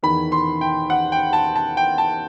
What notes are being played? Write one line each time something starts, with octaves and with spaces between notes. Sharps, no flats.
E2 D#3 B5
C6
G5
F#5
G5
A5
A5
G5
A5